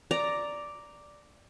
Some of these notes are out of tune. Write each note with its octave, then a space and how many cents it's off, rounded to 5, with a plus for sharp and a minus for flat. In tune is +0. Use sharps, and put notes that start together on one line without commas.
D5 +0 A#5 +0